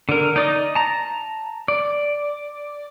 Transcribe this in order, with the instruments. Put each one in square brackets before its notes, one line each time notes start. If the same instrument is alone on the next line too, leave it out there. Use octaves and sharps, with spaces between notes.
[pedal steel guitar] D3 A#4
D#4 D5 D#5
A5 A#5
D5